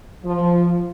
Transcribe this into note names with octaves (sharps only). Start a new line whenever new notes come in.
F3